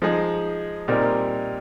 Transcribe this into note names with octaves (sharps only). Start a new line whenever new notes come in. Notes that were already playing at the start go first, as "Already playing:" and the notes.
F3 G#3 D#4 G#4
A#2 G3 C4 D#4 A#4